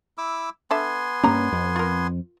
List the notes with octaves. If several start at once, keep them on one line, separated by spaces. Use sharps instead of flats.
E4 D6 E6
B3 D4 A4 E5 G#5 C6
G2 A#3 C#4 G4 A#5
F2
F4 A#4